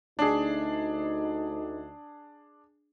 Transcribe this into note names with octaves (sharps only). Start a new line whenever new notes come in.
D2 D4 D#4 G#4